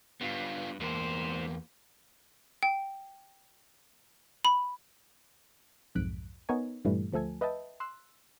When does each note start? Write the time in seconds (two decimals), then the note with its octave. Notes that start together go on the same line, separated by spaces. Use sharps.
0.21 G2 B3 F4
0.80 E2 G#2 A#3 C5
2.63 G5
4.45 B5
5.95 B1 F2 G#2 F#6 B6 D7
6.49 B3 D#4 A#4 C#5 G#5
6.85 G2 A#2 E3 G3 A3
7.13 D2 F3 A3 A4 G#5
7.41 B4 D#5 E5 G5 A5
7.80 C6 E6 F#6